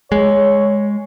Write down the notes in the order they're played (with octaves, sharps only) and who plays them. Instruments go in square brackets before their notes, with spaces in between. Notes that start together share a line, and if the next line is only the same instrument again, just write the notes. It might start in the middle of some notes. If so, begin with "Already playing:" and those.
[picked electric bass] G#3 [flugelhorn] C#5